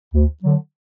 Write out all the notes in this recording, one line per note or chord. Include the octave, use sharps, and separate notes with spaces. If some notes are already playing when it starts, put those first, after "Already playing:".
D2
D3 F#3